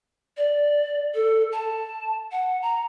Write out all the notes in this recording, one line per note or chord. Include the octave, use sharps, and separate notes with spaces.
D5
A4
A5
F#5
A#5